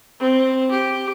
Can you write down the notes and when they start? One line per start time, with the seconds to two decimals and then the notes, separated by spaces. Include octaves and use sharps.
0.20 C4
0.71 G4